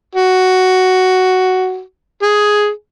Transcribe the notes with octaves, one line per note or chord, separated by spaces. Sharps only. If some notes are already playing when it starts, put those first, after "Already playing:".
F#4
G#4